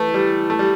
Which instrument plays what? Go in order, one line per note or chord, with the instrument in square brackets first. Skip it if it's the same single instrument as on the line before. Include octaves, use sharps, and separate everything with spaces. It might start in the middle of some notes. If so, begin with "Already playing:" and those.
Already playing: [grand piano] E3 [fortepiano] A3
[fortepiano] G3
A3
G3